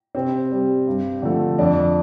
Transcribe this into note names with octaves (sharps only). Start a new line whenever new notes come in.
C3 C4
G3
G2
D3 F3 A3
F2 D4